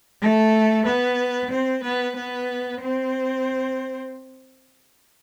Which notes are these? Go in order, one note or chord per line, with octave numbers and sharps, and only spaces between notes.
A3 A4
B3 B4
C4 C5
B3 B4
B3 B4
C4 C5